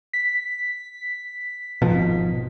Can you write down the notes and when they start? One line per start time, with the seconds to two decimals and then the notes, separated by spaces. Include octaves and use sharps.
0.13 B6
1.82 G#1 B2 F3